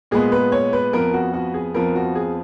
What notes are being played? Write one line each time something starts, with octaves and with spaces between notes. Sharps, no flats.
A#2 G#3 B3 G#4
B4
C#5
B4
F2 F3 B3 A#4
F#4
F#4
G#4
F2 F3 B3 A#4
F#4
G#4